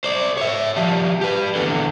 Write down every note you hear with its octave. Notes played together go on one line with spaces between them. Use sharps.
C5 D5
C#5 E5
F3 G3
G4 B4
E2 D3